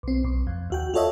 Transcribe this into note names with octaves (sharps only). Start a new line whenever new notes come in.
B1 C4
B1
F2
D#2 F#4 G5
F4 F#4 A4 C#5 D#5 E5